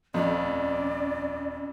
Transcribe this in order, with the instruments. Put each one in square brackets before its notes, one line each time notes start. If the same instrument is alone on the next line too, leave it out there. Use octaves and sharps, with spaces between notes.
[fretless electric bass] D#1 F3 A3 [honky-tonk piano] F2 [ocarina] C#4 [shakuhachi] D5